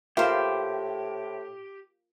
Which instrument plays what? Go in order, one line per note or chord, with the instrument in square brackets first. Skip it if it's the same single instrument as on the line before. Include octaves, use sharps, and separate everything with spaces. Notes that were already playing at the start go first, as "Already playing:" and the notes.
[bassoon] A2 [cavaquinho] E4 C5 [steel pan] F4 A#4 F5 [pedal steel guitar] G4